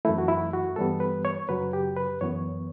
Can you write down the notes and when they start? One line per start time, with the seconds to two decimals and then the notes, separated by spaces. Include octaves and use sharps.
0.05 F#2 E3 A3 E4
0.18 F#4
0.28 E4
0.53 F#4
0.76 G2 E3 G3 B3 A4
1.00 B4
1.25 C#5
1.49 F#2 C#3 F#3 B4
1.73 G4
1.96 B4
2.21 F#2 E3 B3 C#5